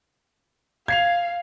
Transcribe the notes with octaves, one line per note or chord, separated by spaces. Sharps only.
F5 G#6 C7 F7